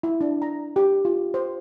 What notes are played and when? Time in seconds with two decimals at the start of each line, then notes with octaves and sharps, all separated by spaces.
0.03 E4
0.21 D4
0.42 A#5
0.76 G4
1.05 F4
1.34 C5